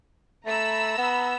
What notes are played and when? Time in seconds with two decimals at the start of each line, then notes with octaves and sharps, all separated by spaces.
0.46 A3 A#5 B5 E6
0.98 B3